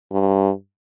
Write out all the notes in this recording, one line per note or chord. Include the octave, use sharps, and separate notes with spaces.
G2